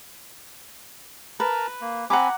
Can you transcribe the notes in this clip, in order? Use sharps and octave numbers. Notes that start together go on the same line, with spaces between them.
A#4 B4 A5 A#5
A#3
C4 F#5 G#5 A#5 B5 D6